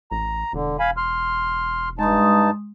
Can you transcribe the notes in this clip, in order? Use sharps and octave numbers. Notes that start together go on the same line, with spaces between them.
A1 A#5
E1 D3
F5 G#5 B5
C6 F6
G2 G#3 D#4 A5 C6 D#6